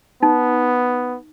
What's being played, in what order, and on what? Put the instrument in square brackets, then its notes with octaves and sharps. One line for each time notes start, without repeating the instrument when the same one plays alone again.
[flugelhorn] B3 [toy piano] D#4